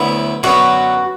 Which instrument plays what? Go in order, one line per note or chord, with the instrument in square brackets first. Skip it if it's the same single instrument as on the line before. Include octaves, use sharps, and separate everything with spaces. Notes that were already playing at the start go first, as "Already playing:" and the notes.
Already playing: [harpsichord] D2 D3 F#3 B3 E4
[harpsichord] F#2 D3 B3 [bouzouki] F#4